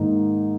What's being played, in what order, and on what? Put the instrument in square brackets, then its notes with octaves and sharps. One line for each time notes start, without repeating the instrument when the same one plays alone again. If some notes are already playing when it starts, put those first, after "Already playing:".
Already playing: [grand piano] G#2 D#3 A#3 D#4